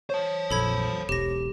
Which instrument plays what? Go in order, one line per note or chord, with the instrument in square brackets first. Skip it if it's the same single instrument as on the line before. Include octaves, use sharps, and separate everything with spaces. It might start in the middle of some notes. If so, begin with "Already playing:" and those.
[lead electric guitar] C5 A5 [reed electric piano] C#5
[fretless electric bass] A#1 F2 [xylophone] A4 B5 G#6
[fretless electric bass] E1 B1 [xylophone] G4 A#6